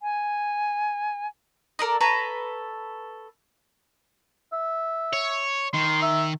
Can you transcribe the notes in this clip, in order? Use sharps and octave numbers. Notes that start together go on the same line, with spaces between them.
G#5
A4 A#4 D5 D#5
A4 B4 C#5 A#5
E5
C#5
D#3 C6
E5